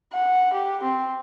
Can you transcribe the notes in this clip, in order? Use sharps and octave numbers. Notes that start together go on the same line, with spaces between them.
F#5
G4
C4